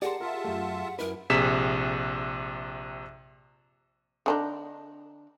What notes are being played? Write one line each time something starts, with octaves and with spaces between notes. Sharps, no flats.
G4 G#4 A#4 D5 F#5 A5 C6
F4 A#4 E5 A5
F#2 A3
F#2 E4 A#4 B4
A#1 C3 G#4 B6 E7
D3 D4 D#4